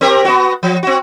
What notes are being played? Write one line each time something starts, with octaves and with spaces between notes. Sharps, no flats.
C4 G4 A#4
B3 F#4
F3
C4 F#4